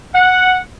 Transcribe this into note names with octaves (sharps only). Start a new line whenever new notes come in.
F#5